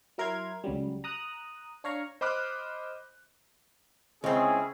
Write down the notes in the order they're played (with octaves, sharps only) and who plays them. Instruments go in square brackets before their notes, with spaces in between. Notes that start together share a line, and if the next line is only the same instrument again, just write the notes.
[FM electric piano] F#3 E4 A#4 A#5 C6 G#6
C#2 C#3 F#3 G3
A#5 D#6 F#6
D4 C#5 F5 A#5 C#6
[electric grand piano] C5 D#5 B5 D6 F6 F#6
[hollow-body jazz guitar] C#2 C4 [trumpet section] C#4 E4 G#4